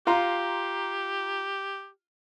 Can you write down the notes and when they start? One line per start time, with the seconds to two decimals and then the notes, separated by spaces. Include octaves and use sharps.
0.07 F4 G4 A#5 C6